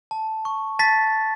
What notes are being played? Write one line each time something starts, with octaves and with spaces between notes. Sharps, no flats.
A5
C#6
A5 A6 B6